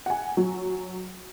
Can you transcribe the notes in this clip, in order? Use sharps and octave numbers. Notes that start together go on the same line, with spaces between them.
F#5 G#5
F#3